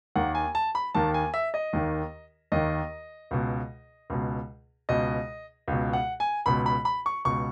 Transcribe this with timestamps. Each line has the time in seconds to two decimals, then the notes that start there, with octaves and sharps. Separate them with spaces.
0.16 D#2 D#3 F#5
0.35 G#5
0.55 A5
0.75 B5
0.95 D#2 D#3 A5
1.14 G#5
1.34 E5
1.54 D#5
1.73 D#2 D#3
2.52 D#2 D#3 D#5
3.31 C#2 B2
4.10 C#2 B2
4.89 C#2 B2 D#5
5.68 C#2 B2
5.93 F#5
6.20 G#5
6.46 C#2 B2 B5
6.66 B5
6.85 B5
7.06 C#6
7.25 C#2 B2 C#6